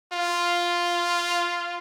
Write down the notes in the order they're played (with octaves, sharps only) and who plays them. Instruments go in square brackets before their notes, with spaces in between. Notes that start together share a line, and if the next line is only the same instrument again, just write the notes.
[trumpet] F4